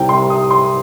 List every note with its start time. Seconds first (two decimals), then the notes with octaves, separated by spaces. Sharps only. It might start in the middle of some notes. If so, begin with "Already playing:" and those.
Already playing: C2 C3 G3 G5
0.09 C6
0.30 D#6
0.51 C6